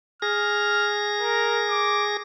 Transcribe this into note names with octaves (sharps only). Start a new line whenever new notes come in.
G#4 F6 A#6
A#4
D6